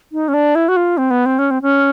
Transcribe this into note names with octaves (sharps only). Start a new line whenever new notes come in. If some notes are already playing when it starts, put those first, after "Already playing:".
D#4
C#4
D4
E4
F#4
F4
C4
B3
C4
C#4
C4
C#4